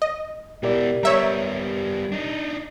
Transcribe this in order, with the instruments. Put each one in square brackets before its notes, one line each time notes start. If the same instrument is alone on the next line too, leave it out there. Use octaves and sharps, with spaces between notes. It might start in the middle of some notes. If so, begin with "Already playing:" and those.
[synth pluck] D#5
[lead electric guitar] B2 E4 [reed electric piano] G4 A#4 D5
[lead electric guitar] G3 B3 [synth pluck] C#5 E5 A#5
[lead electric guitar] D4 D#4